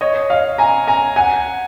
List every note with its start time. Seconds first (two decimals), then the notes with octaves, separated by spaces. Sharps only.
0.01 C#5 D#5
0.30 D#5 F5
0.58 G#5 A#5
0.87 G#5 A#5
1.16 F#5 G#5